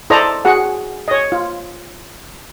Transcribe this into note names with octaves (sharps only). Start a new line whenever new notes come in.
E4 A4 C5 D5 D#5 A#5
F#4 G#4 F#5
C#5 D#5
F4